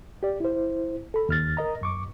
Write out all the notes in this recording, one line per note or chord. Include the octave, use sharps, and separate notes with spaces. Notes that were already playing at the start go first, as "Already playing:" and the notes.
G4 D5
E4 C5
A4 B5
D#2 F6 A6
A#4 D#5 A#5
F#2 C#6 D6